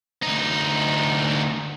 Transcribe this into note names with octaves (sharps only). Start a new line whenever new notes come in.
D2 D#4